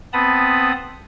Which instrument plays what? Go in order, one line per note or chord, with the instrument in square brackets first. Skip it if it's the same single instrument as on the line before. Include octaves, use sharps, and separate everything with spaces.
[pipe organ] B3 C4 A5 B5 D#6